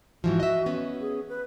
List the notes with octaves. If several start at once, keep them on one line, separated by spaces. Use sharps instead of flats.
G#2 E3 F3 F#4
D#5 E5
B3 C#4
G#4
B4